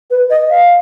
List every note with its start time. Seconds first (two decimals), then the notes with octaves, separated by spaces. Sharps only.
0.11 B4
0.30 D#5
0.50 F5